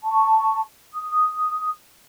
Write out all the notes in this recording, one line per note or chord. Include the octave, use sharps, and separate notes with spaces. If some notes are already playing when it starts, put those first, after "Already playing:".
A5 C#6
D#6